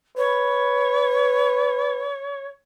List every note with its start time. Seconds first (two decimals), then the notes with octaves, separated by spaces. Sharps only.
0.17 B4 C#5